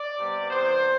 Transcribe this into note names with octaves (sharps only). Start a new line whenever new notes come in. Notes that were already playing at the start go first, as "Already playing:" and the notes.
Already playing: D5
C3 G3 B3
C3 E3 B3 C5